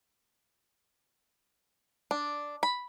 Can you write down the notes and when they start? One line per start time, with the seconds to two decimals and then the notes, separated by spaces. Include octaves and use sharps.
2.11 D4
2.63 B5